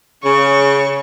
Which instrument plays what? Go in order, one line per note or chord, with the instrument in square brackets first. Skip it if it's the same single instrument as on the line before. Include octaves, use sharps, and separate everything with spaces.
[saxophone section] C#3 [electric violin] C#6